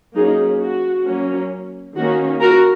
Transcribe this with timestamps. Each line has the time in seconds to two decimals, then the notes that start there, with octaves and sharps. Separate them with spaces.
0.15 F#3 A#3 C#4 D#4 G#4
0.61 F#4
1.06 F#3 A#3 C#4
1.95 D#3 A#3 C#4 F#4
2.40 F#4 A#4